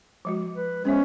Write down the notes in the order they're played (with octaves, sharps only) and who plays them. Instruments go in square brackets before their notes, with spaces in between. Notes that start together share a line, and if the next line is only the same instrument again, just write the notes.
[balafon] F3 G#3 F#4
[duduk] B4
[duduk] G#3 [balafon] B3 C5 E5 [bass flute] C#4